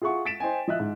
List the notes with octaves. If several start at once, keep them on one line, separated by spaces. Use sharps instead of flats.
F4 G#4 E5 F#5 C#6
A6 B6 D7 E7
C5 D#5 G5 G#5
F3 D#5 E5 F#6
G#2